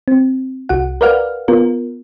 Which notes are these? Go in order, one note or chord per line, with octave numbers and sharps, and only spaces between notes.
C4
C2 F#4 F#5
A#4 B4 D5 F5 F#5 F6
B3 F4 A#4